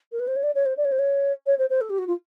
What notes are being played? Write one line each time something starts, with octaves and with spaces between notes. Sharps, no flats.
A#4
B4
C5
C#5
D5
C#5
C5
D5
C#5
C5
C#5
C#5
C5
C5
A4
G4
F#4
F4